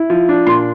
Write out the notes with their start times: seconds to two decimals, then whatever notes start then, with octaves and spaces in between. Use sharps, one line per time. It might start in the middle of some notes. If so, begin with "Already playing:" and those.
Already playing: E4
0.10 F3
0.29 D4
0.47 A#2 C6